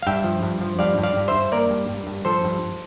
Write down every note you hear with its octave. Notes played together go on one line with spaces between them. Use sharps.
F5
G2 E5 G5
F3
G2
F3
G2 D5 F5
G2
D5 F5
G2
C5 E5
G2
A#3 A#4 D5
G2
G2
G2
F3 A4 C5
G2